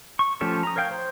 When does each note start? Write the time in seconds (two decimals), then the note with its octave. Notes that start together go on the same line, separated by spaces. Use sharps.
0.19 C#6
0.41 F3 A3 C#4 G4 A4
0.63 A#5 D#6
0.76 A#4 C#5 F5 G5
0.91 C5